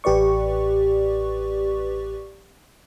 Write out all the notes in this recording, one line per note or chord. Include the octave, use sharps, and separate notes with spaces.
A1 G4 B4 D5 C#6